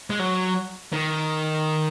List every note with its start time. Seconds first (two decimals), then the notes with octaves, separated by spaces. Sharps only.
0.10 G#3
0.19 F#3
0.93 D#3